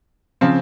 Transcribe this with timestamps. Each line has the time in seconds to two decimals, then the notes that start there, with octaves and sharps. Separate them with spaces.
0.41 C#3 F3 C4 F4